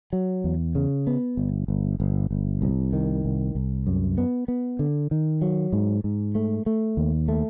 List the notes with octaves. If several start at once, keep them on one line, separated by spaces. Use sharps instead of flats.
F#3
E2
C#3
B3
G1
G1
G1
G1
C2
D#3
C2
C2
F#2
B3
B3
D3
D#3
F#3
G#2
G#2
A3
A3
D#2
A3